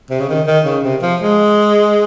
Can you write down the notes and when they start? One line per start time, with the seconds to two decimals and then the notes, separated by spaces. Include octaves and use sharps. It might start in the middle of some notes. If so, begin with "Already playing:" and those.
0.11 C3
0.20 C#3
0.29 D#3
0.47 D#3
0.65 C#3
0.83 C3
1.02 F3
1.21 G#3